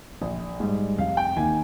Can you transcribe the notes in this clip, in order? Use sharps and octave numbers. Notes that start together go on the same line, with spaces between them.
A#1
G#2 G3
F1 F5
G5
D#2 D#3 G#5